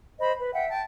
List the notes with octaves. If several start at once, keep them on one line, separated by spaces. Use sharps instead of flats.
C5 D#5 B5
B4
E5 F#5 G5
G5 A5